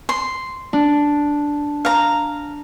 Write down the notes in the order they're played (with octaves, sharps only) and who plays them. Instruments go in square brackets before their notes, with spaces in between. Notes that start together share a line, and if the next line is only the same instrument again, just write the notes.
[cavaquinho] C6
[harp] D4
[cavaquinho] F5 A#5